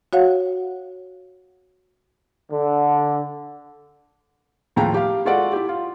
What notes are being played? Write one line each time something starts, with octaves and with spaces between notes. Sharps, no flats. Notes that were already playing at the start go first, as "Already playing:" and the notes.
F#4 C#5 F5 F#5
D3
D#2 A2 F3 G#4 G5 A#5
G4 F5
G#3 F4 F#4 A4 D5 F#5
E4 G4
F4